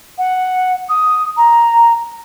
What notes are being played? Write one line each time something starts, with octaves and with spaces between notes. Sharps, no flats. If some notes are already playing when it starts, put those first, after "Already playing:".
F#5
D#6
A#5